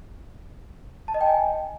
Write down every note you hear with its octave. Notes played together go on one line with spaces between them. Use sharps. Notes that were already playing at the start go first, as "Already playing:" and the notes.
A5
D#5
G5
G#5